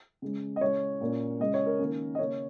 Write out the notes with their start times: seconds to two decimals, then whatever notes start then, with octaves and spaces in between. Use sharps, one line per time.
0.22 C#3 G#3 C#4
0.56 D#5
0.61 C#3 G#3 C#4 C#5
1.01 A#2 A#3 C#4
1.40 C#3 G#3 C#4 D#5
1.54 C#5
1.66 A#4
1.79 D#3 A#3 C#4
2.15 D#5
2.19 C#3 A#3 C#4 C#5